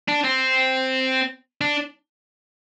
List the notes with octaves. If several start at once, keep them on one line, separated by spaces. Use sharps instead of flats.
D4
C4
D4